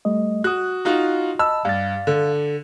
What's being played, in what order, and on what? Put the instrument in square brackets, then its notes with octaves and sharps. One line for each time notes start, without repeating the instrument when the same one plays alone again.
[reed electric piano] G3 A3 D#5
[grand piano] F#4 [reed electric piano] D#6 F#6
[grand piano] D#4 F4 F#4
[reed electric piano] D#5 A5 B5 [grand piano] E6
[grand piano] G2 [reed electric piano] F5 A6
[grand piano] D3